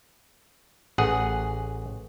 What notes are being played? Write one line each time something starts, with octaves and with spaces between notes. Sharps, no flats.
A1 G#4 F#5